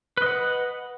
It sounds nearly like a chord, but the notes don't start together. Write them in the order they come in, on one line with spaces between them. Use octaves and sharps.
B4 D#5 F#5